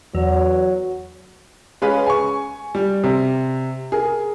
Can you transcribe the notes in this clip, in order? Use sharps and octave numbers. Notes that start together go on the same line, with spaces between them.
E2 F#3
G#3 C#4 G#4 B4 F5
G#5 C#6
G3
C3
G#4 A#4